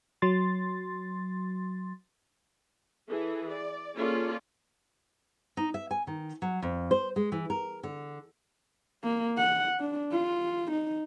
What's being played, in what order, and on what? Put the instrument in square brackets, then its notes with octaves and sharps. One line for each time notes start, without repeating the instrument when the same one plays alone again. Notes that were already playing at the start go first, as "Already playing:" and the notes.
[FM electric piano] F#3 C6 A6
[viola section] E3 G#4 A4
D5
A#3 C#4 F4 G#4 A4 D5
[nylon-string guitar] D#4
E5
G#5
D#3
F#3
F2
C5
G#3
E3
A#4
D3
[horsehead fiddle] A#3
F#5
D4
F4
D#4